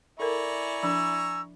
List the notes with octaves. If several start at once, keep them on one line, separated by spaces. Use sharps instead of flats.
E4 A4 A#4 D5 G#5 A#5 C#6
F3 D4 E6